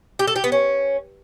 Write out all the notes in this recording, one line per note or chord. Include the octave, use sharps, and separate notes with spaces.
G4
A4
G4
B3
C#4